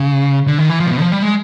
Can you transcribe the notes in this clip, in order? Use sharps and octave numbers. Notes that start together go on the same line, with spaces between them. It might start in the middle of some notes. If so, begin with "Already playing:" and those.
Already playing: C#3
D3
D#3
E3
F3
C3
B2
F3
G3
G#3